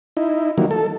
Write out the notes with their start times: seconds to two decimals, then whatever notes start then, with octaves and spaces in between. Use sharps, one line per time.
0.17 D#4 E4
0.58 D#3 E3 F#3 G3 A#3
0.71 A4